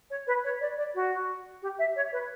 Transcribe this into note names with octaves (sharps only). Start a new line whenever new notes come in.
C#5
B4
C#5
D5
D5
F#4
G4
E5
C#5
B4